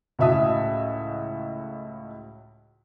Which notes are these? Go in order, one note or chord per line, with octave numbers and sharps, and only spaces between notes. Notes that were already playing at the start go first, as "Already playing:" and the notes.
C#2 A2 F#4 E5 A5 D#6